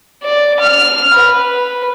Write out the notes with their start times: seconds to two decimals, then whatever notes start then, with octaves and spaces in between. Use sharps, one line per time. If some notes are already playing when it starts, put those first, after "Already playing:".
0.23 D5
0.60 F6
1.14 B4